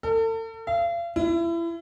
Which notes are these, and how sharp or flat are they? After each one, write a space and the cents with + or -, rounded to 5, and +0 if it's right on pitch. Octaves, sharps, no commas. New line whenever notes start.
A4 +40
F5 -40
E4 +30